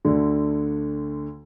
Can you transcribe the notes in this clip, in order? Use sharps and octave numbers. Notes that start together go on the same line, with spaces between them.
D2 D3